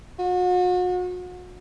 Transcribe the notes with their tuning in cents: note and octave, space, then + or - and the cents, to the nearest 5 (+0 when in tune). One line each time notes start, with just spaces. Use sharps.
F#4 -40